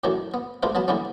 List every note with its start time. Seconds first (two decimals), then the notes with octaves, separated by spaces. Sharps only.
0.04 F#2 D#3 E3 F#3 A3 D4
0.34 B3
0.63 G#3 A3 D4 F4 B4 C5
0.75 F#3 B3 A5 B5
0.88 D3 E3 G3 A#3 B3 C#4